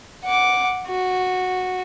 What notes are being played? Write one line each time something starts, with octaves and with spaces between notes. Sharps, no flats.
F#5 D6
F#4